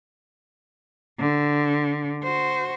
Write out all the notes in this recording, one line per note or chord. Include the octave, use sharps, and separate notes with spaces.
D3
F#4 C5